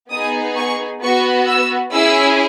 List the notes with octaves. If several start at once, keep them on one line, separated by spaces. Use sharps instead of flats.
B3 D#4 G#4 D#6
C#6
B3 F#4 C#6
E6
C#4 E4 G#4 E6